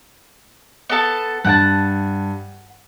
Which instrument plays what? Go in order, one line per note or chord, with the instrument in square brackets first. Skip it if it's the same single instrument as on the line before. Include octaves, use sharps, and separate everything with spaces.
[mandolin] B3 A4 A5
[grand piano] G2 [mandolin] F#5 G5 A5